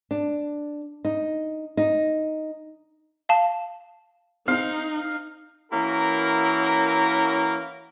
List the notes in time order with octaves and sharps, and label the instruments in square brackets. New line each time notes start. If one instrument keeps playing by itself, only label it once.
[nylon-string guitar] D4
D#4
D#4
[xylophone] F5 A5
[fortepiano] C4 [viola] D#4 [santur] F5
[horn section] E3 A#3 C#4 E4 F#4 A#4